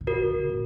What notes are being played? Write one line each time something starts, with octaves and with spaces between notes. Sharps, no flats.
C3
C#3 F#4 A#4
C#3
C3
A#2